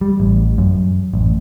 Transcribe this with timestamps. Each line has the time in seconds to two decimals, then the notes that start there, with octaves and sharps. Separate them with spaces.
0.01 G3
0.20 A1
0.58 F#2
1.14 A1